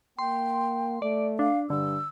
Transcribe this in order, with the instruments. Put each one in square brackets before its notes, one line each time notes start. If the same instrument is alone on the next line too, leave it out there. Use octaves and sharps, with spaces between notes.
[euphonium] A#3 [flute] G5 [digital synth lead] C6
[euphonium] A3 [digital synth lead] D5
[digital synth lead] D4 [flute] F5
[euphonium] G2 [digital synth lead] D3 [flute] E6